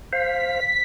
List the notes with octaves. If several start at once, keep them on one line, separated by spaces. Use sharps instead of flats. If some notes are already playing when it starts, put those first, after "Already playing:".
C5 F5 B6